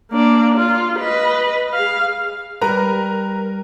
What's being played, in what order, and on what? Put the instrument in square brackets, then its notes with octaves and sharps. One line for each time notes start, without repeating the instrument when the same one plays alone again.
[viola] A#3 D4
F4
B4 D#5
G#4 F5
[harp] G3 [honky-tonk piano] A#4 A#5 [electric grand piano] B4